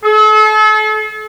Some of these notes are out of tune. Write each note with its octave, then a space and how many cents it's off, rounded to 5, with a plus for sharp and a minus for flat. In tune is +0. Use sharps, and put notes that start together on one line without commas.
A4 -40